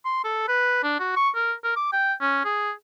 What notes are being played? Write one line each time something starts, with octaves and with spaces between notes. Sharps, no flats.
C6
A4
B4
D4
F#4
C#6
A#4
A#4
D6
G5
C#4
G#4